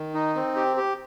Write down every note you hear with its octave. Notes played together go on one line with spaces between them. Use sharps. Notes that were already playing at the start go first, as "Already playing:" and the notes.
Already playing: D#3
D#4
C4
G4
G4